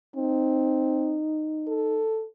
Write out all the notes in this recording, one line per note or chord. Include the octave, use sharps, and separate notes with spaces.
C4 D#4
A4